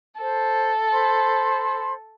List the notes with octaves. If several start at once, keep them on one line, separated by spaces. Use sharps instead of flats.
A4 C5
C5 B5 C6